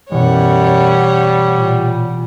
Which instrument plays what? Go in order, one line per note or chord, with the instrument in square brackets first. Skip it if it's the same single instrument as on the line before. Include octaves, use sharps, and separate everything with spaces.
[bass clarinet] F#2 [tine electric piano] B2 E3 [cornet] G3 [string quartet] C#5 F#5
[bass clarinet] A#2